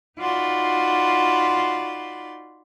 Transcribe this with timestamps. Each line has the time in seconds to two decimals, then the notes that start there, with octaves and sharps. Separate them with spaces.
0.19 D#4 F4 F#4 D5 B5 C6